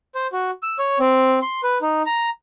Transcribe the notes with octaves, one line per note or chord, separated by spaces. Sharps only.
C5
F#4
E6
C#5
C4
C6
B4
D#4
A#5